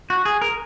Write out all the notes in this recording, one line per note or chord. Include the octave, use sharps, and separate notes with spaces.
F#4
G#4
A#4